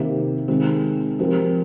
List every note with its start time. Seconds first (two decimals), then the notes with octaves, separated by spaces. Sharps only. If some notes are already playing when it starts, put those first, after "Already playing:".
Already playing: C3 D#3 A#3
0.48 D#3 G#3 C4
1.19 F3 C4 G4 A#4